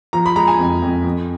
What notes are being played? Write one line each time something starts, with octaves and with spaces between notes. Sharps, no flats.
F3 A#5
B5
G#3 A#5
G#5
F2
F2
F2